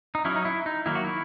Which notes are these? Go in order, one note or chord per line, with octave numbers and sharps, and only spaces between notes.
D#4
F#3 C#4 E4
D#4
E4
D#4
D#3 F#3 A#3 E4
F#4
E4